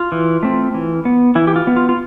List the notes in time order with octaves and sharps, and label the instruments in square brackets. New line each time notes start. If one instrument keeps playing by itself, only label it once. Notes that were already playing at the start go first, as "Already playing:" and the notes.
Already playing: [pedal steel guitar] F4
E3
A3 C4
E3
B3
E3 E4
G4
F4
B3
F4
F4